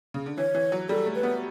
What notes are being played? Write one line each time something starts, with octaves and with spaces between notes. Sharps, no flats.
C#3
D3
E3 C#5
E3
F#3
G3 A4
A3
B4
B3